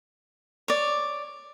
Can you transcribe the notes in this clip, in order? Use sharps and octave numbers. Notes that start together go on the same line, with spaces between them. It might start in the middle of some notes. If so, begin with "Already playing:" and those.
C#5 D5